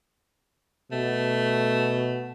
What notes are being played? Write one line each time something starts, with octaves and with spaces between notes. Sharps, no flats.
B2 A3